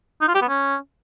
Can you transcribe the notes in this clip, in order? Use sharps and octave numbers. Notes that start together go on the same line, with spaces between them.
D#4
F4
G4
B3
C#4